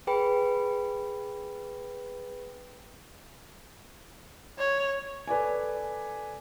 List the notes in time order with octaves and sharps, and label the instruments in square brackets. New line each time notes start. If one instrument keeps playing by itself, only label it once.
[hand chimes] G#4 B4 G5 B5
[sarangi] C#5
[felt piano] A4 B4 D5 G#5